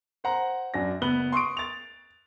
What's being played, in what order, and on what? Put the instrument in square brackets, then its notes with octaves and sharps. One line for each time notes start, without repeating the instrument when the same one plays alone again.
[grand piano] C5 F#5 A#5
F#2 D4 A#6
F#1 B3 B5 F#6 G7
C6 C#6 D#6 D7
A6 F7